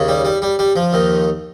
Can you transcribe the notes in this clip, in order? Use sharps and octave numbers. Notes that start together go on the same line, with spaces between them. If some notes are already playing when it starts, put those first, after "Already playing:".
Already playing: D#2 C#3
G3
G3
G3
G3
F3
D#2 D#3